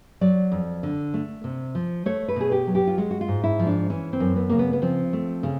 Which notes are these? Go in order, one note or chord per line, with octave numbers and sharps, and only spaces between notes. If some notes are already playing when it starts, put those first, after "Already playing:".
F#3 D5
F2
D3
A3
C3
F3
A3 C#5
B4
B2 G#4
G4
F#3
G4
F4
G#3 F#4
F#4
F4
G#2
E4
F3
D4
E3 C#4
C4
F#2
B3
C#3 A#3
B3
B3
F3 C4
A3
C#3